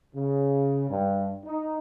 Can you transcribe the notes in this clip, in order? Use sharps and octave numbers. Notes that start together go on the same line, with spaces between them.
C#3
G2
D#4